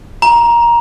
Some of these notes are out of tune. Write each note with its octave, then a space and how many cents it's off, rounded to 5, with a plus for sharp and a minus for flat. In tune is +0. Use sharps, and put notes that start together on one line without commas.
A#5 +15